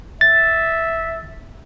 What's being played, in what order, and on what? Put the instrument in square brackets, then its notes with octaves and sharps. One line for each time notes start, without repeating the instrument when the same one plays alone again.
[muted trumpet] E5 [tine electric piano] A6